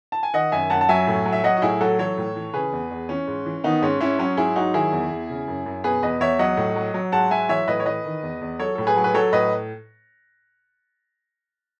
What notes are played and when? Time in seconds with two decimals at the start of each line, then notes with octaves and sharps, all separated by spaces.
0.12 A5
0.23 G#5
0.34 D#3 D#5 F#5
0.52 F#2 E5 G#5
0.70 F#2 F#5 A5
0.81 A5
0.89 F#3 E5 G#5
1.07 A2
1.26 F#3
1.32 E5
1.43 F#3 D#5 F#5
1.57 F#4
1.62 A2 E4 G#4
1.81 F#3 F#4 A4
1.98 E3 A4 C#5
2.18 A2
2.35 E3
2.54 C#3 G#4 B4
2.72 E2
2.91 E2
3.09 E3 C#4
3.27 G#2
3.46 E3
3.64 D#3 B3 D#4
3.82 G#2 C#4
4.00 G#2 C#4 E4
4.19 F#3 C#4
4.37 G#2 E4 G#4
4.56 F#3 D#4 F#4
4.74 D#3 E4 G#4
4.92 E2
5.11 E2
5.30 C#3
5.48 F#2
5.66 F#2
5.84 B2 G#4 B4
6.03 E2 B4 D#5
6.20 E2 C#5 E5
6.39 F#3 D#5 F#5
6.57 A2
6.76 F#3
6.94 F#3
7.12 G#2 F#5 A5
7.31 F#3 E5 G#5
7.49 E3 C#5 E5
7.68 A2 B4 D#5
7.80 C#5
7.86 E3 B4 D#5
8.05 D#3
8.23 E2
8.41 E2
8.59 F#3 A4 C#5
8.75 A2 A4
8.87 G#4 B4
8.97 F#3
9.04 B4
9.14 F#3 A4 C#5
9.33 A2 B4 D#5